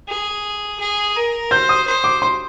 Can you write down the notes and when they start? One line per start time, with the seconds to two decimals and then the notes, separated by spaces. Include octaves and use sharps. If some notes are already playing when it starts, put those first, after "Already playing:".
0.08 G#4
0.80 G#4
1.16 A#4
1.51 C5 G6
1.69 D#6
1.87 C5
2.04 D6
2.22 C6